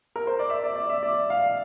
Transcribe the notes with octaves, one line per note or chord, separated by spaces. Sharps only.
A#4
C5
D5
E5
D5
D5
E5
D5
F5